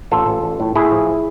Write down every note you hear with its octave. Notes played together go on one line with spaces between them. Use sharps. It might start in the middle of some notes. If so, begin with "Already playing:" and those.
A1 F4 A4
A1
A1
A2
A2 E4 G#4
F3